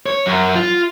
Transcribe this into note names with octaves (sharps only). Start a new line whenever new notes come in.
C#5
F#2
F4